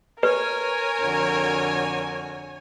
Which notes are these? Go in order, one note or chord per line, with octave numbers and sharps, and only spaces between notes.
A#4 B4 C#5 G#5
F2 D3 F#4